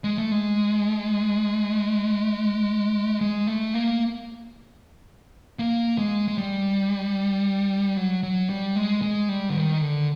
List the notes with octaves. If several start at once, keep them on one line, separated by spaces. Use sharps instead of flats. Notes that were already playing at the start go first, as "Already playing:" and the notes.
G#3
A3
G#3
G#3
A3
A#3
A#3
G#3
G#3
G3
F#3
F#3
G3
G#3
G#3
G3
D3
D#3
D3